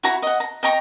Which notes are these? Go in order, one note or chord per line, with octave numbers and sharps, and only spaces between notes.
E4 F#4 A#5
D#5 F#5
A#5
D#5 G5 A#5 C#6